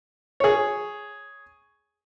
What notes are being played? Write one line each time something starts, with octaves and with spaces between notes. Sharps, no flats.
G#4 C#5